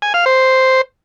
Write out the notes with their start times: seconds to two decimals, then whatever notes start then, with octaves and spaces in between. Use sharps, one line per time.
0.02 G#5
0.14 F5
0.26 C5